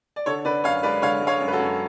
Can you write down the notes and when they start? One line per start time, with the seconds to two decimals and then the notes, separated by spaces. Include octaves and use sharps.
0.16 D5
0.26 D3 A4 C#5
0.45 D3 B4 D5
0.64 F#2 C#5 F5
0.83 G#3 B4 D5
1.02 D3 C#5 F5
1.21 G#3
1.27 C#5 F5
1.41 F#2
1.48 B4
1.52 F#4 A4
1.59 F#2